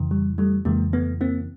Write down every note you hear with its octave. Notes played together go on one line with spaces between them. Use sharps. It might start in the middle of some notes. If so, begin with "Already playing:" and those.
Already playing: F2 C#3 E3
G3
G3 A3
F2 C#3 E3 G#3 A#3
A3 B3
A#3 C4